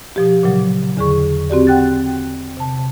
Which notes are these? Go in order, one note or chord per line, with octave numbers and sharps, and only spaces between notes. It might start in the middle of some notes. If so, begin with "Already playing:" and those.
B2 F3 G4
A#2 C#3 F#3
E2 D3 G#4 C#6
C4 F#4 G4 D5
F#5 G5 F#6 A6
C3 A5